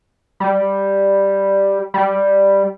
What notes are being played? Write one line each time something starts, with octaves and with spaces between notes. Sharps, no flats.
G3
G3